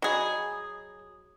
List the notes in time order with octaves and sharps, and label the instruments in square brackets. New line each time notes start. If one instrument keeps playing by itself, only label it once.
[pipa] F#3 G#4 [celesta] D#5 G#5 B5
[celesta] D#6